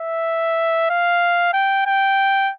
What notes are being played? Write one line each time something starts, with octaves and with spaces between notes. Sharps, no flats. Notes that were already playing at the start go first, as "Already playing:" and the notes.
Already playing: E5
F5
G5
G5